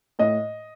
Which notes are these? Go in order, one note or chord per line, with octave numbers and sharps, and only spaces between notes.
A2 D#5